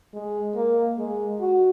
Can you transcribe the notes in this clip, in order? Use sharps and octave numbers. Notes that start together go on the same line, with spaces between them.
G#3
A#3
G#3
F#4